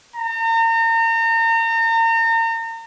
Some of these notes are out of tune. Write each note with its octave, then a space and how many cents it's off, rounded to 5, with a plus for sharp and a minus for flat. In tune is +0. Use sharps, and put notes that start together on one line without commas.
A#5 -40